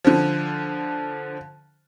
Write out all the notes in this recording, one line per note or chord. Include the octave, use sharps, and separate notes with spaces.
D3 F3